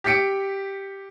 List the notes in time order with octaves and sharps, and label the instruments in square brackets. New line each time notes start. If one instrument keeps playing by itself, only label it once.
[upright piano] G4 G6 B6 C#7 D7